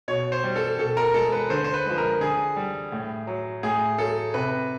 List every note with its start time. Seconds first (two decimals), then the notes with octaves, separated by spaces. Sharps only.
0.08 B2 C#5
0.32 C5
0.44 G3
0.56 A4
0.79 B2 A4
0.97 A#4
1.14 G#3 A4
1.32 B4
1.50 D3 C5
1.64 C5
1.74 B4
1.86 F3 G#3
1.98 A#4
2.21 D3 G#4
2.56 G3
2.92 A2
3.27 F#3
3.63 A2 G#4
3.98 F#3 A4
4.34 C3 B4